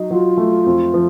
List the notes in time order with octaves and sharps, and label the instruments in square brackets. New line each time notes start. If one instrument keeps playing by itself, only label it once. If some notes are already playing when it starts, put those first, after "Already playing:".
Already playing: [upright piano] F#3 D#4
[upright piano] F#3 [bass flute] F4
[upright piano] A3
F2
F3